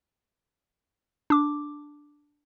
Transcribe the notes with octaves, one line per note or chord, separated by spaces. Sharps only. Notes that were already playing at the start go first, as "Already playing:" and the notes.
D4 D6